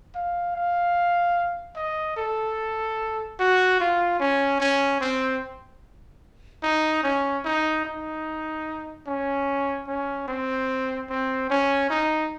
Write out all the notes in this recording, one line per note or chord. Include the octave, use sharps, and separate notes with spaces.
F5
F5
D#5
A4
F#4
F4
C#4
C#4
C4
D#4
C#4
D#4
D#4
C#4
C#4
C4
C4
C#4
D#4